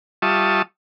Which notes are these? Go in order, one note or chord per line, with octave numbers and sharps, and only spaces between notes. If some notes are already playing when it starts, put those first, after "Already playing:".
G3 F4 E5 A5 C#6 D#6